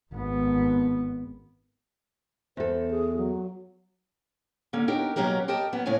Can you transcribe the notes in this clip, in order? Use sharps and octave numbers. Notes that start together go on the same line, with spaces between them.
G#1 B3
E2 A4 C5
G#4
F#3
D3 A#3 C#4
B3 D4 D#4 G4 A#4 C#5
B2 F#3 A#3 C#4 G4 A#4
G4 A#4 D#5 G5 A5
F#3 B3 C#4
A2 C#3 D4 C#5 G#5